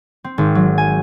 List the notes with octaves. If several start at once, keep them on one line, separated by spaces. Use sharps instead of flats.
C4
G#1
F#3
G#5